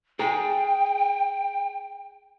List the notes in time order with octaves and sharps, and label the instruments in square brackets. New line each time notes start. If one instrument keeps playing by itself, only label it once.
[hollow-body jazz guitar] G#4 A#5 [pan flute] G5